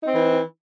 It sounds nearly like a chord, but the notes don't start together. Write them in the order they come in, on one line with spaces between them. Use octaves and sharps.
D#4 C4 E3